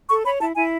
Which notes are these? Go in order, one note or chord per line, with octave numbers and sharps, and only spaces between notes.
A4 C#6
C#5 B5
E4 A5
E4 G#5